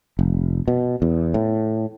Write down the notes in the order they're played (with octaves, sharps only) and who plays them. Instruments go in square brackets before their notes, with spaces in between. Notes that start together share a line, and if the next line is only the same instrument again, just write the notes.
[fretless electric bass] F1
B2
E2
A2